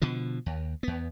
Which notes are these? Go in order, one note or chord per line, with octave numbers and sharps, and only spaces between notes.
B2 D3 F3
D#2
E2 B3